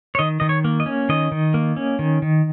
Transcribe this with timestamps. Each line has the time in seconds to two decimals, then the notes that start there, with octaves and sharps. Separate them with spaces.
0.15 C#5
0.19 D#3 D#5
0.40 D#3 D#5
0.49 C#5
0.64 A#3
0.80 D#5
0.86 C#4
1.09 D#3 D#5
1.32 D#3
1.54 A#3
1.77 C#4
1.99 D#3
2.22 D#3